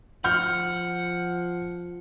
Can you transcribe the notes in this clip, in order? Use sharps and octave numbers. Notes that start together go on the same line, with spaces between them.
F3 F#5 F6 G6